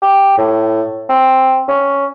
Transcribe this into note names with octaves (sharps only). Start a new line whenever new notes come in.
G4
A2
C4
C#4